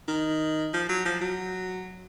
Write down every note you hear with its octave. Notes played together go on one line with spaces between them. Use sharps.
D#3
F3
F#3
F3
F#3